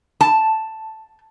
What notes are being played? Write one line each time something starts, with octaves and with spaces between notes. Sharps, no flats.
A5